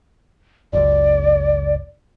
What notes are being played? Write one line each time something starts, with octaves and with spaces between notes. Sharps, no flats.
F#1 C#2 D5